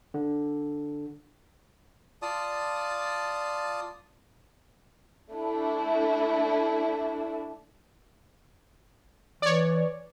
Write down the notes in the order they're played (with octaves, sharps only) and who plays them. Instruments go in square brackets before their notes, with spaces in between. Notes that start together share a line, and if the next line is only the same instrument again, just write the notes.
[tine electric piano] D3
[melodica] F4 D5 A5 D#6
[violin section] A3 D4 E4
[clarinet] E3 [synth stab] C#5 D5